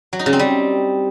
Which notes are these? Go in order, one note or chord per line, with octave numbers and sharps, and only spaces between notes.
F#3
D#4
C#3
C4
G3